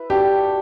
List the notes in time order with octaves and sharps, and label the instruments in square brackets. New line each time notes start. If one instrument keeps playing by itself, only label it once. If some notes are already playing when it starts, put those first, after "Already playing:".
Already playing: [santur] E4 B4 E5
[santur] A3 D4 F#4 [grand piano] G4